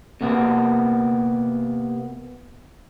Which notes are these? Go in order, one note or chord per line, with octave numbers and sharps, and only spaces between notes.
C3 A#3 B3